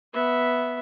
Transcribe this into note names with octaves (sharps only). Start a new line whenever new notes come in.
B3 E5